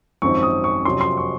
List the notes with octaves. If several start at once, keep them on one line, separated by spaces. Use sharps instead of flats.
G#1 F#2 F3 C4 D#4 C#6
D#6
C#6
F2 C3 F#3 C#4 C6
C6
C#6